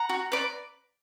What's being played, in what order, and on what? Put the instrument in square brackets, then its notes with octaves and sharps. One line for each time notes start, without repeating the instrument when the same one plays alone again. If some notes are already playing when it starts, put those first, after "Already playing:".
Already playing: [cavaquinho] F#5 A#5
F#4
B4 D5